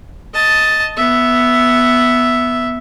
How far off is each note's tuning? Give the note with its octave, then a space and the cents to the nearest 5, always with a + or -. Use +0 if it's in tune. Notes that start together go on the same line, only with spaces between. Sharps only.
D#5 +10 A5 +0
B3 +0 E5 +0